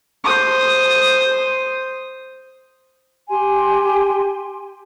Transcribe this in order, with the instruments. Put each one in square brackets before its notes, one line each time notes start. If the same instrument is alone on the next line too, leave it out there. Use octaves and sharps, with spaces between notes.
[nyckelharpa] C5 D#6
[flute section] G4 G#5 C6